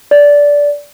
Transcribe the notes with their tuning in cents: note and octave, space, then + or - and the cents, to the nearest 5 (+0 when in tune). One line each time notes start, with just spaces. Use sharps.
D5 -15